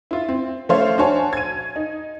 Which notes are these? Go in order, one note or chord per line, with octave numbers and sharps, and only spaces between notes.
E4 F4
C4
F3 A3 C#4 C5 C#5 F5
D4 F#4 C5 C#5 G#5 A5
G#6 D#7
D#4